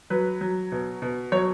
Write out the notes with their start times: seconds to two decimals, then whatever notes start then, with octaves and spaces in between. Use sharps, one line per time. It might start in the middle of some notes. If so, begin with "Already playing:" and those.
0.10 F#3 B4
0.41 F#3
0.72 B2
1.02 B2
1.32 F#3 C#5